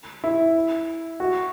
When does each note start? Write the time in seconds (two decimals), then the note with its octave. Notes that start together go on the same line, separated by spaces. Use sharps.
0.24 E4
1.20 F#4